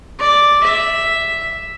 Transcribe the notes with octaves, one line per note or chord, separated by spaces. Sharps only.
D5
E5